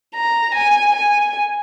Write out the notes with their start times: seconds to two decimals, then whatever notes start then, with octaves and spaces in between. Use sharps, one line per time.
0.15 A#5
0.55 G#5
0.95 G#5